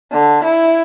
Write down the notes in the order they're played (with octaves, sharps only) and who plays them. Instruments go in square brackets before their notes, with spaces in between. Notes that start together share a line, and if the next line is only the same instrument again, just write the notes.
[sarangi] D3
E4